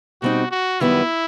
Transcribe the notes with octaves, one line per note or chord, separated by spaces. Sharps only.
B2 G3 C4 D#4 F#4
F#4
F#2 D#3 G3 B3 E4